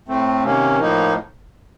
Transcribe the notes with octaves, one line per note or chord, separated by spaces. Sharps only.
A2 A3 C4
C3 D#3 A#3 C#4
A2 F3 A#3 D#4